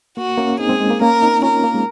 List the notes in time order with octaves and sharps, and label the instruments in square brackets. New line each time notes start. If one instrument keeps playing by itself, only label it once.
[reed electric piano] A#3 [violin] F#4
[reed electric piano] A#3 C#4
[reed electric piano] C4 D#4 [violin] G#4
[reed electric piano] G#3 C4
G#3
A#3
[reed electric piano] A#3 C#4 [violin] A#4
[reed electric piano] C4 D#4
[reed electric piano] C#4 F4 [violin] A#4
[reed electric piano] A#3
G#3